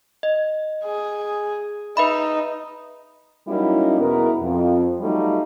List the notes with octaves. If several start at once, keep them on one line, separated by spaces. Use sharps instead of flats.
D#5
G#4
D#4 B4 E5 B5
F#3 G3 A#3 C#4 D#4 E4
E2 B2 B3 E4 A#4
F2
F#3 G3 A3 D#4 F4